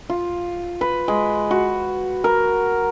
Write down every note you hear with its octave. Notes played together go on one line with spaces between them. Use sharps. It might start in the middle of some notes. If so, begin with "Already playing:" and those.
F4
B4
G#3
F#4
A#4